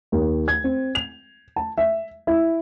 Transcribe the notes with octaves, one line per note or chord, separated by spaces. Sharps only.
D#2
G#6
C4
F7
A5
E5
E4